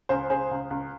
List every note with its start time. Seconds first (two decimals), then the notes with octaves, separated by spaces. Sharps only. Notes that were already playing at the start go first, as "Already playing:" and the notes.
0.09 C#2 G#4 C5
0.30 C#2 G#4 C5
0.51 C#2
0.71 C#2